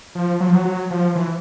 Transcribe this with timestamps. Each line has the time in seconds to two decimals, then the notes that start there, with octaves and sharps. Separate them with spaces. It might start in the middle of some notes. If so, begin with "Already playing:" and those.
0.15 F3
0.40 F#3
0.48 F3
0.55 F#3
0.65 F#3
0.91 F3
1.15 E3